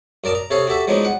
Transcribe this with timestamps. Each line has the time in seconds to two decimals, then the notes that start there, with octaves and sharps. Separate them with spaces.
0.24 F#2 A#4 D5 A5 D#6
0.35 A#5
0.50 C3 A4 C#5 F5 D#6
0.67 F#4 G4 A4 E5
0.88 F3 F#3 G#3 B3 D4 D#4
1.05 F#5